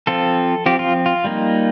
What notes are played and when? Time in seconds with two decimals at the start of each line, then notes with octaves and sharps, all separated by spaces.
0.07 F3 C4 F4 A4
0.66 F3 C4 F4 G4
0.79 F4
1.06 F4
1.24 G3 A#3 D#4